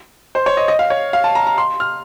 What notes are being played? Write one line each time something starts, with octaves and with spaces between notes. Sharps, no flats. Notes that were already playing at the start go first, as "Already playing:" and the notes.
C5
C#5
D#5
D#5
F5
C#5
F5
A5
A#5
A#5
C6
F6